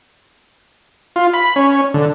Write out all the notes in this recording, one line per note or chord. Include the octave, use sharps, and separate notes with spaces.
F4
B5
C#4
D3